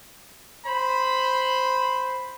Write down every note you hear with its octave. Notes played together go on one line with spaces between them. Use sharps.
C5 B5